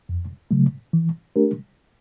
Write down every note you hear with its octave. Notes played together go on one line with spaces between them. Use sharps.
F2
C#3 F#3 A3
E3
A3 D4 G4 A#4